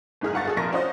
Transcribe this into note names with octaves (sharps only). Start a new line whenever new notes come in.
F#1 G#2 G#4 F6
G1 F4 F#5 C#6 A6
F#4 G#4 A4
F1 F2 A#2 A#4 C#6 A#6
C#4 F4 F#4 C5 D#5